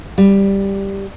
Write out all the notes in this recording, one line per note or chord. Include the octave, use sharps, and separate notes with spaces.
G3